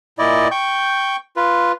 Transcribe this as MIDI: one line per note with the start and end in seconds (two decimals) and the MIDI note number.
0.19 0.48 46
0.19 0.48 64
0.19 0.48 74
0.19 0.48 75
0.51 1.16 79
0.51 1.16 85
0.51 1.16 91
1.36 1.72 65
1.36 1.72 71